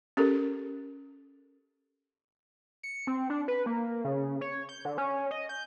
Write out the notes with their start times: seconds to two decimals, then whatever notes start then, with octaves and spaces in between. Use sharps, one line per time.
0.17 C#4 G4 A4 A#4
2.83 C#7
3.07 C4
3.30 D4
3.48 B4
3.66 A#3
4.04 C#3
4.41 C#5
4.69 G6
4.85 D3
4.98 C#4
5.31 D#5
5.49 G6